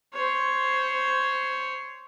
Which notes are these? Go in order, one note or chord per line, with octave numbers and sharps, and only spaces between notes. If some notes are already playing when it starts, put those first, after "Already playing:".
C5 C#5